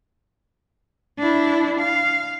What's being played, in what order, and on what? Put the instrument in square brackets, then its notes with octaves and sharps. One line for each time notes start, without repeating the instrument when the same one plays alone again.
[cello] D4 E4
F5